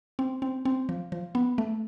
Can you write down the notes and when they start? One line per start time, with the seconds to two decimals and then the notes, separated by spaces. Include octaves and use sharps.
0.19 C4
0.42 C4
0.65 C4
0.89 F3
1.12 F3
1.35 B3
1.58 A3